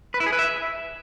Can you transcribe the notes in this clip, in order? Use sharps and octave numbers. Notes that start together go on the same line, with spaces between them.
B4
E4
G#4
B4
E5